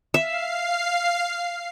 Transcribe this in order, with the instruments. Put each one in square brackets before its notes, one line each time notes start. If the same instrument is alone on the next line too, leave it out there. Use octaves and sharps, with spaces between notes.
[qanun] E5 [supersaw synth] F5 C7